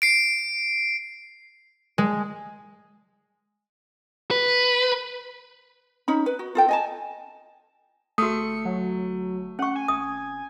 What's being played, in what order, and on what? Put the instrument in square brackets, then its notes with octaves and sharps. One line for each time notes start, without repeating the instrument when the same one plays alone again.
[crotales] C7 D7
[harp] G#3
[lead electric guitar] B4
[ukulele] C#4 D#4 B5
B4
F#4
F4 A4 G5
D#5 G#5 A5
[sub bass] G1 [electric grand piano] A3 [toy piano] F#4 D#6 [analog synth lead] C#7
[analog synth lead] F#3
[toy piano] C#4 C#6 [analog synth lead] F#5
[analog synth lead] G#5
[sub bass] G#1 [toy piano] D#6